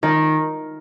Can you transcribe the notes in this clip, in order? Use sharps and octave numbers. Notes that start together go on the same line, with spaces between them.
D#3